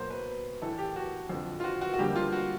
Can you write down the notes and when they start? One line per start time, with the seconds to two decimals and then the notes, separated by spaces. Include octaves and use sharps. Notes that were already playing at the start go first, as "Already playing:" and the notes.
Already playing: B2 F#3 A#3 C5
0.10 B4
0.61 A2 E3 A3 A4
0.78 G4
0.96 F#4
1.29 F2 D3 F3
1.60 F4
1.64 F#4
1.81 F#4
1.94 F#4
1.98 F2 D3 G3 A#3 G4
2.16 F4
2.33 F#4